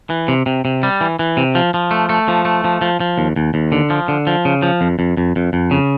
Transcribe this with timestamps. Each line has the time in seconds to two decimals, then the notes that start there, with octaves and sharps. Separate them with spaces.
0.10 E3
0.28 C3
0.46 C3
0.65 C3
0.83 G3
1.01 E3
1.19 E3
1.37 C3
1.55 F3
1.74 F3
1.91 A3
2.09 A3
2.28 F3
2.45 A3
2.64 F3
2.81 F3
3.00 F3
3.18 D#2
3.36 D#2
3.54 D#2
3.72 D3
3.90 F3
4.08 D3
4.27 F3
4.45 C#3
4.62 F3
4.81 F2
4.99 F2
5.17 F2
5.36 F2
5.53 F2
5.71 C#3